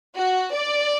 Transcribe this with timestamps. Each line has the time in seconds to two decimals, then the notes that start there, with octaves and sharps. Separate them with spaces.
0.14 F#4
0.54 D5